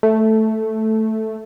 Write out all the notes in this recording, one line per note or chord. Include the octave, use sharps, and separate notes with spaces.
A3